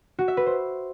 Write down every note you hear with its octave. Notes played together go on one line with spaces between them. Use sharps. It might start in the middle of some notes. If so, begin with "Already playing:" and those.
F#4
E5
B4
C5